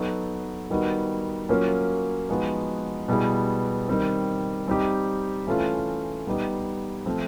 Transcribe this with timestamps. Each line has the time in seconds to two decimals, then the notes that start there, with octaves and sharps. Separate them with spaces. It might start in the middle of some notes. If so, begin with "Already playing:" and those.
Already playing: F#3 B3 D#4 F#4 A4
0.70 D#3 G3 B3 D#4 F#4
1.49 F#3 A#3 C#4 F4
2.29 F3 G#3 B3 D#4 F#4
3.08 B2 G3 B3 E4 G#4
3.88 D#3 G3 C4
4.68 G3 C4 D#4 G4
5.47 E3 A3 C#4 F4 A4
6.27 G3 B3 D#4 G4
7.06 F3 A3 C4 F4